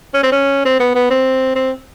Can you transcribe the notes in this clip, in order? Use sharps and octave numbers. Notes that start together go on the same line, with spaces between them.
C#4
C4
C#4
C4
B3
B3
C4
C4